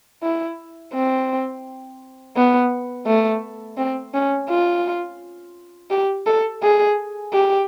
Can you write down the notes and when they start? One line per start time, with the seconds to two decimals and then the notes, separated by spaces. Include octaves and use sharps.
0.23 E4
0.94 C4
2.36 B3
3.06 A3
3.78 C4
4.14 C#4
4.49 F4
5.90 G4
6.26 A4
6.63 G#4
7.33 G4